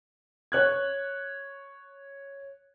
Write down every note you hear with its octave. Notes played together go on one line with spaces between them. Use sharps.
C#5 F#6 G#6